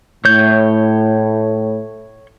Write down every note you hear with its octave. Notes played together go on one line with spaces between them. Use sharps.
A2 C#5 G6